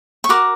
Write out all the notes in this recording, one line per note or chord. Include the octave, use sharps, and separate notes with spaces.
C#6
F#4 A#4 D6